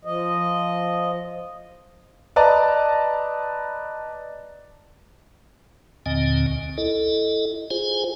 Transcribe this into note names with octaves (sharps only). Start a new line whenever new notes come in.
F3 D#5
B4 D5 D#5 A5 A#5
D#2 A#2 D3 C4 D#5 G#5
C#2
E4 A4 D#5
F4 G#4 C5 G#5